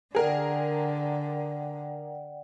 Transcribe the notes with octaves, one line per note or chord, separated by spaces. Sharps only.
D3 G#4 A#4 D5 F#5 G5